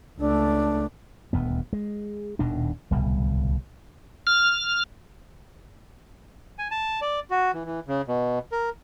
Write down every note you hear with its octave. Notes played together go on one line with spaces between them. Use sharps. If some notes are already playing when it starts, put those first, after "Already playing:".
C#2 A3 D4
D#1 D2 B3
G#3
D#1 B2 D#3 D4
D1 C2 B2 G3
F6
G#5
A5
D5
F#4
E3
E3
C#3
B2
A#4